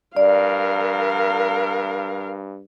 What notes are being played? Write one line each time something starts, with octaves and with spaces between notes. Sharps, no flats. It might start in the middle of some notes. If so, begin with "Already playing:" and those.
G2 A#4 D5 F5